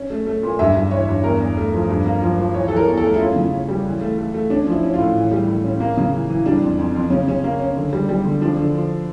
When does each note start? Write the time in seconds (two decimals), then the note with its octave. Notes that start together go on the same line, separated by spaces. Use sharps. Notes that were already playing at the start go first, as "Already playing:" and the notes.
Already playing: C#4
0.10 A3
0.26 A3
0.43 A#2
0.59 G2 E5
0.75 G2
0.91 E3 C#5
1.08 G2
1.24 E2 A#4
1.40 E2
1.57 A3
1.73 F3
1.89 G2
2.05 A#3
2.22 F3
2.38 F3
2.54 E3 C#5
2.68 E3 A4
2.76 A#4
2.88 E2
2.97 A4
3.04 A3
3.14 E4
3.19 C#4 F4
3.36 C#3
3.52 C#4
3.69 G3
3.85 E3
4.01 A3
4.18 A3
4.34 A3
4.50 C#4 D4
4.66 F3
4.72 E4
4.83 C#4
4.94 A2 F4
5.16 E3
5.31 G3
5.48 A2
5.64 C#4
5.80 A#3
5.97 C#3
6.12 E3
6.30 E3
6.46 G3 D4
6.62 F2
6.78 F2
6.95 F2
7.10 C#3 C#4
7.28 C#3 C#4
7.44 A#3
7.60 C#4
7.77 D3
7.93 G3
8.09 G3
8.25 D3
8.41 F3 D4
8.57 D3
8.74 F3